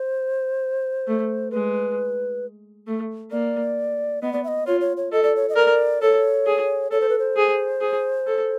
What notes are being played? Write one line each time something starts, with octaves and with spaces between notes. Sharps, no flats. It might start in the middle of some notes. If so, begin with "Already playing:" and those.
Already playing: C5
A3
G#3 B4
A3
A#3 D5
B3 D#5
D5
E5
D#5
F4 C#5
C#5
C#5
A4 D#5
D5
C#5
D#5
A#4 D5
A4 C#5
G#4
A4 C#5
C5
B4
C5
G#4
G#4
A4